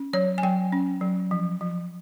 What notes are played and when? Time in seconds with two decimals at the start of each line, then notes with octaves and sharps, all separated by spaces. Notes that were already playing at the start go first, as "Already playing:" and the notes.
Already playing: C#4
0.13 F#3 C#5
0.38 G#5
0.43 F#3 G5
0.72 C#4
1.01 F#3
1.31 F3
1.61 F3